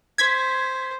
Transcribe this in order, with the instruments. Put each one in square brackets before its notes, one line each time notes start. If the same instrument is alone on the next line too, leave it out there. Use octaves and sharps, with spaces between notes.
[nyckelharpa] C5 [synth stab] G#6 B6